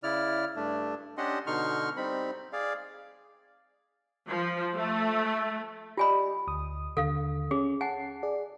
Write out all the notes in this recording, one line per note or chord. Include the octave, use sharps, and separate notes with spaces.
C#3 E4 D5 F6
G2 A3 D4
C#4 D4 G4 D#5 F#5 C6
B2 D3 D#4 C6 C#6 F6
G3 C4 D#4 B5
G#4 D5 F5
F3
A3
F4 G4 D5 D#5 G#5 B5
D2 D#6
D#2 D3 A4 F5
C#4 G#4
F#5 G#5 A5 C7
G#4 D5